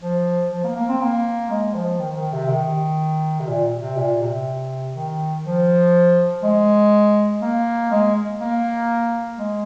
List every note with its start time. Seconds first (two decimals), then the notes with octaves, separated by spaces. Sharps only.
0.02 F3
0.52 F3
0.64 A#3
0.75 A#3
0.89 C4
1.01 A#3
1.50 G#3
1.74 F3
1.99 D#3
2.16 D#3
2.33 C3
2.48 D#3
3.39 C3
3.47 A#2
3.80 C3
3.96 A#2
4.22 C3
4.94 D#3
5.44 F3
6.43 G#3
7.42 A#3
7.91 G#3
8.41 A#3
9.38 G#3